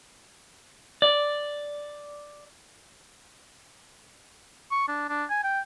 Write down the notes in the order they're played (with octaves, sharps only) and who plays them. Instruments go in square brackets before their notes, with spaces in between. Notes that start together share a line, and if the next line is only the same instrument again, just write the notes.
[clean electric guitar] D5
[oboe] C#6
D4
D4
G#5
G5